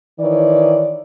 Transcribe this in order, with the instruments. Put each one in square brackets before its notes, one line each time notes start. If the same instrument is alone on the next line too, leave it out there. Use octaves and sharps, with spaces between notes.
[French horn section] D#3 E3 C#5 D5